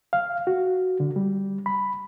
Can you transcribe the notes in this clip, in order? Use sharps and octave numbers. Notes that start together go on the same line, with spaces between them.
F5
F#4
D3
G3
B5